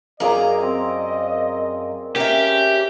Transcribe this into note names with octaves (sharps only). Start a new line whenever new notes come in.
F#2 A#3 G#4 D5 D#5 A#5
C4
C#4 G4 A#4 E5